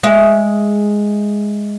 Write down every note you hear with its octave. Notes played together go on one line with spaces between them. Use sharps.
G#3 E5